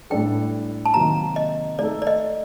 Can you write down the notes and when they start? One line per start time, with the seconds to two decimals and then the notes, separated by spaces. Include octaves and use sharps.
0.10 A2 G3 D4 A4 G5
0.85 A5
0.94 C3 D#3 F#3 A#3 A#5
1.36 D#5
1.78 A3 D#4 A4 D5
2.02 D5
2.07 D#5